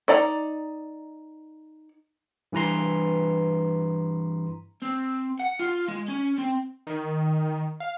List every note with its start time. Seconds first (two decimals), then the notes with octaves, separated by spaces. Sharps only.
0.08 D#4 D5 A#5
2.52 G2 E3 B4 A#5 C6
4.82 C4
5.40 F#5
5.60 F4
5.88 G#3
6.09 C#4
6.38 C4
6.87 D#3
7.80 F5